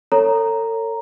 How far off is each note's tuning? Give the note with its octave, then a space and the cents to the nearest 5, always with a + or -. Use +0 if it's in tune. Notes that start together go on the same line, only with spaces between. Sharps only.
A4 +35 C#5 +0 A#5 +0